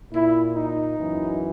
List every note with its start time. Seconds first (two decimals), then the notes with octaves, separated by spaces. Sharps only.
0.12 A#2 E4
0.55 D#4
0.98 F#2 E3